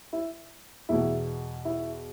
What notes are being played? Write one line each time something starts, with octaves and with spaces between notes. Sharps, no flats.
E4
E2 B2 E4
E4